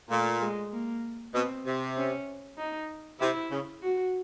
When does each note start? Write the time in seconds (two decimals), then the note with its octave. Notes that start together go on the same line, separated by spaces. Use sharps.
0.11 A#2 A3
0.42 G#3
0.72 A#3
1.34 B2 C4
1.66 C3
1.97 C#4
2.58 D#4
3.20 C3 E4
3.51 C#3
3.83 F#4